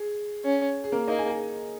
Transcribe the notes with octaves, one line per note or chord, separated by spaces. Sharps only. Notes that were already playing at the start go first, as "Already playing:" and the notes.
Already playing: G#4
C#4
G#4
A#3 A#4
A#3 D#4 D#5
G#4 G#5
G#4 G#5